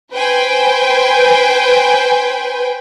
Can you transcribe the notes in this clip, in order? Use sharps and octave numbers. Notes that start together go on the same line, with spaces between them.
B4 C5 G5 G#5